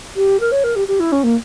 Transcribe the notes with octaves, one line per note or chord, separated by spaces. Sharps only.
G4
A#4
C#5
A#4
G4
G4
E4
C#4
A#3